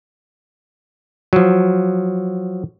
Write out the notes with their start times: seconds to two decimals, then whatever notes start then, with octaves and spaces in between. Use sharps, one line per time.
1.33 F3 F#3